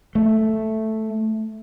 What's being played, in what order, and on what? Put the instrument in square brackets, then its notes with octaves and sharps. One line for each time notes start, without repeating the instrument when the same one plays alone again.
[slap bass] A3